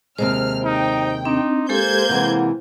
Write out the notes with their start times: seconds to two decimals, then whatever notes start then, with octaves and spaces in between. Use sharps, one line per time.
0.18 D#2 C3 G#3 C5 F6
0.64 D#4 G5
1.25 C4 D4 D#4
1.69 G#3 A#3 G4 A4 C5 G6 G#6
2.09 C3 E3 G#3 F#5